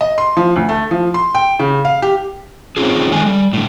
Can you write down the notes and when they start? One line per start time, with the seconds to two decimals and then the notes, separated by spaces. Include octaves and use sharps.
0.01 D#5
0.18 C6
0.37 F3
0.56 D2
0.69 A3
0.91 F3
1.14 C6
1.35 G5
1.59 C#3
1.85 F5
2.02 G4
2.77 C4 C#4 D#4 F4 G#4
3.12 D#3 G#3 A4 G#5
3.26 G3
3.53 A2 D3